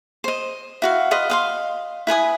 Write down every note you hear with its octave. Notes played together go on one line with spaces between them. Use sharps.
C5 D#5
E4 F#4 F5
B4 D#5 F5 C6
D#5 F5 C6
E4 B4 G#5 D#6